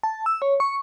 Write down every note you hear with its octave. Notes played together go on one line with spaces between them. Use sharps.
A5
E6
C#5
C#6